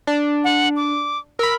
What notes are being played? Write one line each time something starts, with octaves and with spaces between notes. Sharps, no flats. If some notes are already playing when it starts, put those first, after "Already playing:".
D4
F#5
D6
A#4 B5 E6